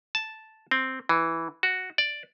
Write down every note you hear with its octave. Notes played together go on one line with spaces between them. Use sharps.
A5
C4
E3
F#4
D5